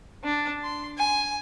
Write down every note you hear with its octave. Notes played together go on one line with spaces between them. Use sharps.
D4
C6
G#5